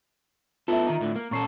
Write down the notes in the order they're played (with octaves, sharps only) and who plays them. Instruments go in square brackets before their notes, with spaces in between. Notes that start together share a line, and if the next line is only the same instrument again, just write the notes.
[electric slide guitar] B3 E4 A4 [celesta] F4 E5
[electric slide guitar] D#3 D#4
A2 D3
A#3
[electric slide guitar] A#2 C#4 A4 [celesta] A#5 C#6 C7